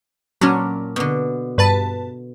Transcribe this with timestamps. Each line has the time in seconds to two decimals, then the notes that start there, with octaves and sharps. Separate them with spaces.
0.41 A#2 F#3 C#4 D4 A#4
0.96 B2 D3
1.58 G2 B4 A5